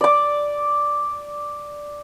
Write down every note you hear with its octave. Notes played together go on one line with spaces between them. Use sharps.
D5 D6